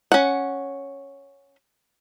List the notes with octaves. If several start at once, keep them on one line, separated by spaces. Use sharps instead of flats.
C#4 F#5